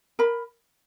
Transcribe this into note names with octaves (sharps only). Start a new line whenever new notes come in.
A#4 B5